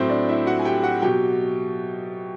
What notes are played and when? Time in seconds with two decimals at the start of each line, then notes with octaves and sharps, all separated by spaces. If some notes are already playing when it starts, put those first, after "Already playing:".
Already playing: A2 F#3 C4 C5
0.10 D4 D5
0.29 E4 E5
0.46 F#4 F#5
0.59 G#5
0.65 G4 G5
0.83 F#4 F#5
1.02 B2 F#3 G4 G5